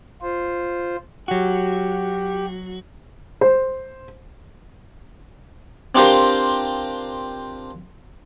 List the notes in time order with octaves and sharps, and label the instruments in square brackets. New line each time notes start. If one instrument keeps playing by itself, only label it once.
[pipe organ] F4 C5
[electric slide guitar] F#3 F#4 [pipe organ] G4
[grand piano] C5
[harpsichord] C4 D4 F4 G4 A#4 C5